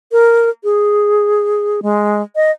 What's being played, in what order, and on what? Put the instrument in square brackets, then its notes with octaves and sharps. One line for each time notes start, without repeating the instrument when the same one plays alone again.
[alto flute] A#4
G#4
G#3
D#5